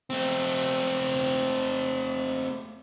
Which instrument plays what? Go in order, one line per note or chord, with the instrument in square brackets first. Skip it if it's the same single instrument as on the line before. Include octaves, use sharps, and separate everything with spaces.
[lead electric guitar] A3 C4